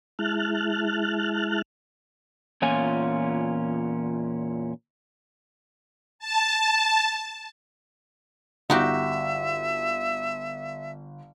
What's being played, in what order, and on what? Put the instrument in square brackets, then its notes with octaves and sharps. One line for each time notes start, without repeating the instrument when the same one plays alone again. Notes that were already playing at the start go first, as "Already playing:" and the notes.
[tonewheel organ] G#3 E4 A5 F6 F#6
[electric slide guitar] E2 A#2 C#4 F4 G#5
[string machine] A5
[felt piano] G1 [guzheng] D#4 F#4 G4 [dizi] E5